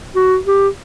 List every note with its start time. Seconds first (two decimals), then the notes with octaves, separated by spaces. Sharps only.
0.15 F#4
0.47 G4